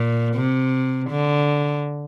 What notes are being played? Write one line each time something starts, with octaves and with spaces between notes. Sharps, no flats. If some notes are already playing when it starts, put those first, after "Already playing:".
Already playing: A#2
C3
D3